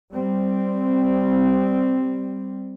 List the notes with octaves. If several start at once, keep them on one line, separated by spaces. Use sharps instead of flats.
G3 C4